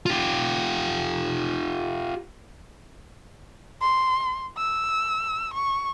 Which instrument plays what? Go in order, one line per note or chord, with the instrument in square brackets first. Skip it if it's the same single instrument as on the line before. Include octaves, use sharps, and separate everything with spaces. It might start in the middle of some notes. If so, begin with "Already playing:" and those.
[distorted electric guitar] F4 G4
[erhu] C6
E6
C#6